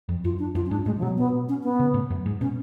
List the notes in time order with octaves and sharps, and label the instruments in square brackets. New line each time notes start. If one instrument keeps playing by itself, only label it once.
[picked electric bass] F2
[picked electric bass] F#2 [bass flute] F4
[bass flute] D4
[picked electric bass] F#2 [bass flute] F4
[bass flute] C#4
[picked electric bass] G#2 [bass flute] D4
[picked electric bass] A2 [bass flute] G#3
[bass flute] F3
[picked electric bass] B2 [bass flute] F#3
[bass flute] B3
C#4
B3
[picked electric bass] C#3
A2
F#2
G#2
[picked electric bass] B2 [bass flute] C#4